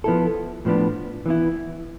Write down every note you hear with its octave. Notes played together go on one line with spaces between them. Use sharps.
F3 B3 E4 A4
A2 F3 B3 D4
E3 B3 E4